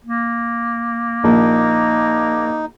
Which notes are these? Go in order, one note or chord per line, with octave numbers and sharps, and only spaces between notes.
A#3
A#1 D#4